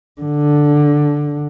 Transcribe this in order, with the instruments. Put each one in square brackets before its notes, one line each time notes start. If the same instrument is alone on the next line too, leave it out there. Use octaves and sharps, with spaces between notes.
[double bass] D3